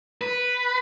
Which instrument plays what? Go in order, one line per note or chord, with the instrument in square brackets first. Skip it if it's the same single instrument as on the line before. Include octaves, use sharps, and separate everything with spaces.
[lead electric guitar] B4